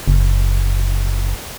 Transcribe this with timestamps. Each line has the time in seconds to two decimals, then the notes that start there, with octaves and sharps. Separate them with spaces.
0.08 F#1